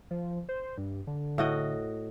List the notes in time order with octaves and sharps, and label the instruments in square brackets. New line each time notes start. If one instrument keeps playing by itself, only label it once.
[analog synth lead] F3
C5
G2
D3
[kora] A2 F#4 D#5